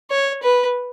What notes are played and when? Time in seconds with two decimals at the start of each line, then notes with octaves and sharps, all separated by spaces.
0.10 C#5
0.43 B4